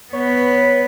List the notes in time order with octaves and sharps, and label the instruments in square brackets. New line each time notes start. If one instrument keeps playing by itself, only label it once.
[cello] B3 B4 [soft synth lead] C#5